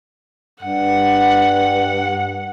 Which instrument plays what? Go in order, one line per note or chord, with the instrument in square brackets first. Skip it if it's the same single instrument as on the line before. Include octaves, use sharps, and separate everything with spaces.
[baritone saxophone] G2 [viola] F#5